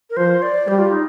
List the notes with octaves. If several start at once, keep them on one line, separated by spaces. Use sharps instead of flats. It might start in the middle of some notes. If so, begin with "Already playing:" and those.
A#4
F3 C5
D5
G3 G4
F4
D#4